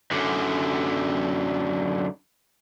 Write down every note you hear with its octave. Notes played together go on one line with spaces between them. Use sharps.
F#2 D3